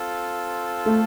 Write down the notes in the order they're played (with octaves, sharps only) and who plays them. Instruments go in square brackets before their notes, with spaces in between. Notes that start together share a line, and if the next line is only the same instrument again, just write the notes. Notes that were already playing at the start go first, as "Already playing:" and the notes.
Already playing: [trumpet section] C4 F4 A4
[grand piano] A3